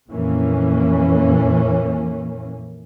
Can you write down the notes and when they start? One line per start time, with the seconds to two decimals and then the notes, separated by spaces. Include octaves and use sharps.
0.10 F2 A#2 E3 A#3 C#4